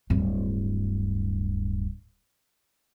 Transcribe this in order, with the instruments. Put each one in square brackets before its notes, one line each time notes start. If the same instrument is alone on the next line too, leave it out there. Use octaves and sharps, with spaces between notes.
[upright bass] D1 G2